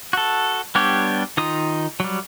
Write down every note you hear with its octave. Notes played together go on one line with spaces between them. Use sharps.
F#4 A4
G3 B3 D4 G4 C#5
D#3 D#4 F4 D#6
F#3 G3